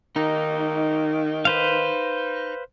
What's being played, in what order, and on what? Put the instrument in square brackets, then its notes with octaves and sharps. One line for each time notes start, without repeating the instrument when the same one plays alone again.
[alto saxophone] D#3 [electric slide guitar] D#4
[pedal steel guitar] B4 C5 F5